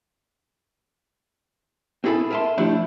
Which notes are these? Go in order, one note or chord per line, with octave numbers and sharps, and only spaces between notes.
C4 E4 G#4 A4 G#5 B5
A#4 E5 G#5 A5 C6
F3 G3 A3 D4 E4